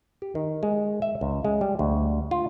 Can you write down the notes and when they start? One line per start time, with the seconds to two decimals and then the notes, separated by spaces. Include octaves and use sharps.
0.22 G4
0.35 D#3
0.63 G#3
1.02 E5
1.21 C#2
1.45 G#3
1.61 G3
1.79 D2
2.31 F4